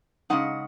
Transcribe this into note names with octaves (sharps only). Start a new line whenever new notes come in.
C#3 G#3 D#4 F#5